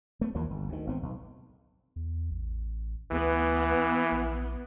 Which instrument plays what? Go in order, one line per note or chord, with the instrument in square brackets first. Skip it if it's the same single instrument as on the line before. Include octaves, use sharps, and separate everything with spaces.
[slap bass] A3 B3
D#2 E3 F3 A#3
G1
D2 D#3
G#1 B3 C4
B1
[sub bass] E2
A1
[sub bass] D2 [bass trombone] E3 [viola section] B3
[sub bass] A#1